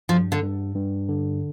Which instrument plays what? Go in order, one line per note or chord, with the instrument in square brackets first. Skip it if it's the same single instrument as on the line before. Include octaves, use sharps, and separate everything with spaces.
[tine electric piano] G2 [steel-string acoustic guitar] F3
[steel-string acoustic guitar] D3
[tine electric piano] G2
G2
D3